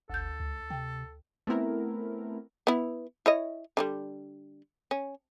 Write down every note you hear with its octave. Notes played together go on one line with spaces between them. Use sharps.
G1 D2 A4 G6
C#2
C3 G5
A3 B3 C4 E4 A#4
B3 E4
E4 C#5 D#5
D3 F3 G3
C#4